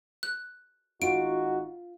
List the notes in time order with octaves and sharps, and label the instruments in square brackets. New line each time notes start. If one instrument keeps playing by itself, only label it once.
[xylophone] F#6
[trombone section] G#1 D#4 F#4 [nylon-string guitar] F4 [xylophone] D7